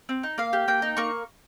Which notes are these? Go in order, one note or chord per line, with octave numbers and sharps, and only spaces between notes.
C4
D#4
A#3 F5
G4
A#3 G5
D#4
A#3 C#6